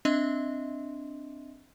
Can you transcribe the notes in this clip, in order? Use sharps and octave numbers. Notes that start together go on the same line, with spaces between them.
C4 D4 D#5 E5 C6